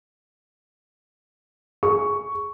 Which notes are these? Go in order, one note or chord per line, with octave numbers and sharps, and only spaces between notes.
G#4 C#6